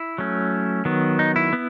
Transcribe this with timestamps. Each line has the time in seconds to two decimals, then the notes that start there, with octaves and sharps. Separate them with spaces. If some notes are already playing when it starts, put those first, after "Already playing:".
Already playing: E4
0.18 F#3 A3 C#4
0.85 D#3 F#3 B3
1.19 D#4
1.36 E4
1.53 B3